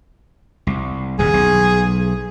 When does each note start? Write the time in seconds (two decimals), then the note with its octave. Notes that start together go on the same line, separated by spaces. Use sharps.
0.67 C2
1.19 D#1 F#2 C3 G#4
1.33 B1